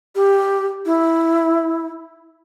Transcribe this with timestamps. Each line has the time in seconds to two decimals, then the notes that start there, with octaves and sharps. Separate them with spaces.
0.15 G4
0.85 E4